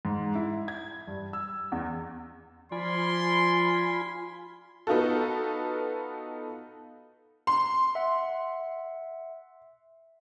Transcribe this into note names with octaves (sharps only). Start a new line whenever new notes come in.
G#2
E4
G#6
G2
E6
E2
F3 F4 D5 G#5 B5 C6
B3 D#4 F4 F#4 A4
C6
E5 F#5